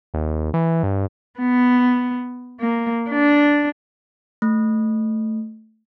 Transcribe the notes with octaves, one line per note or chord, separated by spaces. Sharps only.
D#2
E3
G2
B3
A#3
D4
A3